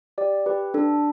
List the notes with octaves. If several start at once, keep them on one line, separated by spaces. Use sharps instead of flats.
G4 D5
G4 B4
D4 A4